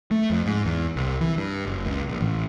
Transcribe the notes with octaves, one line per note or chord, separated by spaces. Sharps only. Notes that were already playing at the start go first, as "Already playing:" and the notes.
A3
F2
G#2
E2
C2
E3
G2
F#1
C#2
A#1
A1